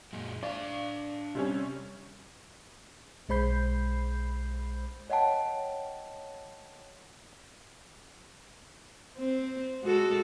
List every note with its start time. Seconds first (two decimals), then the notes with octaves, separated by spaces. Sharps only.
0.13 F#2 A#2 G#3
0.43 D4 D5 F5
1.35 C3 G3 C#4
3.29 B1 G#3 C5 B5 G6 C7
5.10 C#5 D#5 F#5 G5 A5
9.18 C4
9.83 G#3 F#4 A4